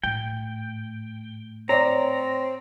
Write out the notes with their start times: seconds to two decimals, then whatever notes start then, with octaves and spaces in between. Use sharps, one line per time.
0.03 A2 G5
1.69 C4 C#5 D5 A#5